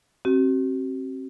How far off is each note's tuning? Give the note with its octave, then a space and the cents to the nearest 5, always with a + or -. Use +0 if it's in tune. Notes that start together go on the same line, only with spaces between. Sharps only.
C4 +30 F#4 +40